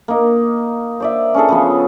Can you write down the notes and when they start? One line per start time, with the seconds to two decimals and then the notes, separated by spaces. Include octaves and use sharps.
0.08 A#3 D#4
1.00 C5 D5 E5
1.34 C#4 D4 G#4 A4
1.49 C#3 F3 B3